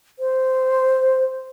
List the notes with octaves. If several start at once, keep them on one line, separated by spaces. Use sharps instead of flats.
C5